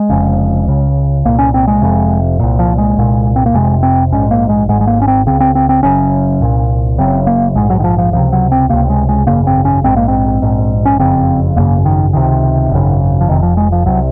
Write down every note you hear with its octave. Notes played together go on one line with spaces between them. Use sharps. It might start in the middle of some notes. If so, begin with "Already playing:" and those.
Already playing: G#3
F1 F2 C#3
C#2 C#3
C2 A#2 A#3
C#4
C4
G#3
F1 F2 C3
C2 A#2
F3
G#3
C2 A#2
C4
A#3
F1 F2 C3 G#3
C4
A#1 G#2 C#4
A#3
G#3
G#1 G#2 G#3
G#3
A#3
C#4
C4
C#2 C#3 C4
C4
C4
C4
F#1 F#2 C#3 C#4
C2 A#2
F#1 F#2 C#3 C4
A#3
A#1 G#2 G#3
F#3
D#3
F3
F3
C#2 C3 F3
F#3
C4
C#2 C3 A#3
G#3
G#3
G#1 F#2 C#3 A#3
C4
C#4
A#1 G#2 C4
A#3
C4
A#1 G#2
C#4
F#1 F2 C#3 C4
G#1 F#2 C#3 A#3
D#3
C#2 C3 D#3
G#1 F#2 C#3
F3
F1 F2 C3 D#3
F3
G#3
F3
C2 C3 F#3